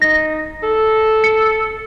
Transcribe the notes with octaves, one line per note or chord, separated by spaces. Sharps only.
D#4 A#6
A4
C#7